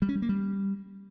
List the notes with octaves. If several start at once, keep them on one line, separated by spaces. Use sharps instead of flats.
G3
C#4
G3
A#3
G3